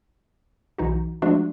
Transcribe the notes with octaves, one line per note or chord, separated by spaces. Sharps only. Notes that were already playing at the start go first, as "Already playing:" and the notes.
B1 E3 D#4 F#4
F3 G#3 A3 D4 F#4